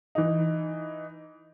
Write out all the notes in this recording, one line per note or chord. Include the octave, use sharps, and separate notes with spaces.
E3 D#4